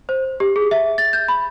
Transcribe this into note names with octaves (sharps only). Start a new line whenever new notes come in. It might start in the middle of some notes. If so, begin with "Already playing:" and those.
C5
G4
G#4
E5
A6
G6
B5